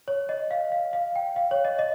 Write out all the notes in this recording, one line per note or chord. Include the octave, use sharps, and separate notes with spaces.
C#5
D#5
F5
F5
F5
G5
F5
C#5
D#5
D#5